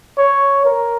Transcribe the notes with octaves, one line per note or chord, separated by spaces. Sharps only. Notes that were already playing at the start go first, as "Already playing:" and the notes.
C#5
A#4